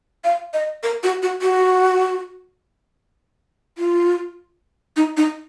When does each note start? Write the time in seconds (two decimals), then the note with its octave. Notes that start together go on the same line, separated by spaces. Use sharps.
0.24 F5
0.54 D#5
0.83 A#4
1.03 F#4
1.23 F#4
1.42 F#4
3.78 F4
4.97 D#4
5.17 D#4